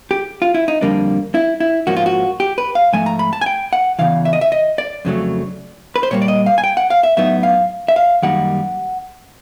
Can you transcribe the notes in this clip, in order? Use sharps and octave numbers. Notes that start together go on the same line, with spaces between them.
G4
F4
E4
D#4
F2 D3 G3 A#3 D4
E4
E4
G#2 F3 A#3 C#4 F#4
F4
F#4
G4
B4
F5
G#2 F3 A3 G#5
A#5
B5
A5
G#5
G5
F#5
E2 C#3 E3 F5
E5
D#5
E5
D#5
D5
F2 C#3 F#3 A3
B4
C5
A#2 G3 A#3 C#5
D5
D#5
F5
G#5
G5
F#5
F5
E5
A2 F#3 B3 D#4 E5
F5
E5
F5
F#2 D#3 G3 A#3 D#4 F#5